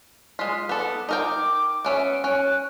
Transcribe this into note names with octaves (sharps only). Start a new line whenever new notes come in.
G#3 F4 B6
B3 A4 D6
D#4 A#4 G5 D6
B3 C#4 E5 D7
C#4 F#6